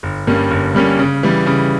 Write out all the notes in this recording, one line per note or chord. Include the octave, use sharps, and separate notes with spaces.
G1
G2 G3 A#3 C#4
G1
G2 G3 A#3 C#4
C#3
E3 G3
C#3